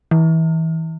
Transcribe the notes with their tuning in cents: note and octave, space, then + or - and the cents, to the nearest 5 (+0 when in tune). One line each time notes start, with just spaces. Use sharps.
E3 -30